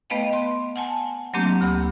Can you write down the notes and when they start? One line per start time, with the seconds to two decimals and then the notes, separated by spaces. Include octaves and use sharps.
0.10 A3 B3 B4 D#5 F5 G5
0.33 C6
0.76 F#5 G#5 A5
1.34 F#3 A3 A#3 C4 D4 G4
1.61 D2 B5 E6 G6